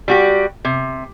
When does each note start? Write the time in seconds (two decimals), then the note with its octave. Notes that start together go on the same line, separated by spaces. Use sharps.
0.08 G3 F#4 G4
0.65 C3